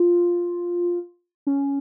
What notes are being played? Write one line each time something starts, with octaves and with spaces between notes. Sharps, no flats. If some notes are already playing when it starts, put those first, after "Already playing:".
Already playing: F4
C#4